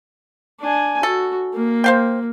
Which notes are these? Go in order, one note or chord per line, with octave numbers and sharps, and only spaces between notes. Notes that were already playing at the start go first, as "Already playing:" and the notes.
D4 G#5
F#4 A4
A#3
C5 F5 G5